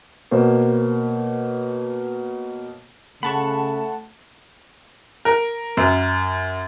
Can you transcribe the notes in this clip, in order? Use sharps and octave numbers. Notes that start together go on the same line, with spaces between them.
B2 A#3 C5 C#5
C#3 A3 F#5 A5 B5 C#6
A#4
F#2